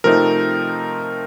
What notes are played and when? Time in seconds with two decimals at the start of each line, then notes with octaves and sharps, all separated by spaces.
0.04 C3 F3 A3 C4 D#4 A#4